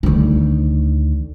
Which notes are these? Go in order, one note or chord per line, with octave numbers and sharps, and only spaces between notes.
D2 D#3